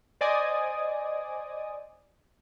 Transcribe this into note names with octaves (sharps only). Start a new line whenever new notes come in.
C5 D5 D#5 G#5 D6 D#6